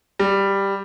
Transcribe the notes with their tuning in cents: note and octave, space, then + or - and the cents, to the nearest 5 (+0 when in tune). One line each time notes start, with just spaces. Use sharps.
G3 +5